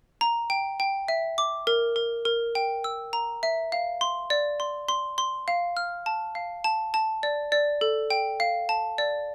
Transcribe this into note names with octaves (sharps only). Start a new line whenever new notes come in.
A#5
G5
G5
E5
D6
A#4
A#4
A#4
G5
E6
A#5
E5
F5
C6
D5
C6
C6
C6
F5
F6
A5
F5
A5
A5
D5
D5
A4
G5
F5
A5
D5